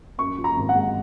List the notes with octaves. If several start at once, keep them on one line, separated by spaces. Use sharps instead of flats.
F#2 C#6
F3
A#5
G#1
F#5
G#3